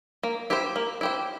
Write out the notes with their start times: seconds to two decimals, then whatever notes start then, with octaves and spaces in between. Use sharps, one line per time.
0.23 A#3
0.50 E4 G4 C5
0.76 A#3
1.01 E4 G4 C5